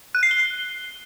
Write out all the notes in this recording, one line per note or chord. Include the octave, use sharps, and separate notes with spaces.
F#6
C7
G7